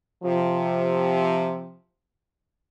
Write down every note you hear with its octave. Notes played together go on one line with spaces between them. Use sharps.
C3 F3